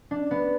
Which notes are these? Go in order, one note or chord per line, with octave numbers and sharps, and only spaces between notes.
D4
B3